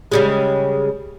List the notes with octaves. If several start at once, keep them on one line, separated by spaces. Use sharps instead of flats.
C#3 G3 G#3